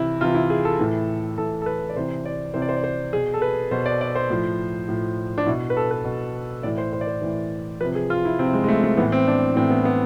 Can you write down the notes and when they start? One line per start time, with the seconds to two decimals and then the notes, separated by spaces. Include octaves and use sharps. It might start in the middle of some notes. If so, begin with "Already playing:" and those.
Already playing: C3 E3 E4
0.21 C3 F4
0.24 E3
0.34 E4
0.50 G#4
0.65 A4
0.79 A2 E3
1.38 A2 E3 A4
1.62 A4
1.66 B4
1.90 D5
1.96 C3 E3 C5
2.25 D5
2.54 C3 E3 C5
2.62 D5
2.69 C5
2.76 D5
2.84 C5
3.13 B2 G#4
3.34 A4
3.42 B4
3.71 B2 C5
3.86 D5
4.01 D5
4.15 C5
4.30 A2 F3
4.88 A2 F3
5.38 D4
5.46 B2 E4
5.70 B4
5.77 A4
5.91 B4
6.05 B2
6.63 A2 E3 D5
6.78 C5
6.93 C5
7.01 D5
7.07 C5
7.22 A2 E3
7.81 C3 F3 B4
7.95 G#4
8.10 F4
8.25 E4
8.39 C3 C4
8.43 F3
8.54 G#3
8.64 G#3
8.68 A3
8.84 A3
8.97 E3 B3
9.00 A2
9.12 C4
9.27 D4
9.56 A2 E3 C4
9.70 B3
9.85 B3